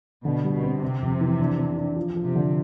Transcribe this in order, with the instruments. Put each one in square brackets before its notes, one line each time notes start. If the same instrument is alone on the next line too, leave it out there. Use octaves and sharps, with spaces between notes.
[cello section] B2 [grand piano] D3
[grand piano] G3
[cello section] B2
[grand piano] C4
[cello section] C3 [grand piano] C4
[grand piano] F2
E3
D4
D4
D4
F3
F3
[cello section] C3
[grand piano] D3